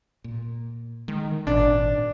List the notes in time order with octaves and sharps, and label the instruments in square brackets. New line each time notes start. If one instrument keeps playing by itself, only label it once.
[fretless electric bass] A#2
[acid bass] D#3 [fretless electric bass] G#3
[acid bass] G#1 [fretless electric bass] A#2 [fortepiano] D4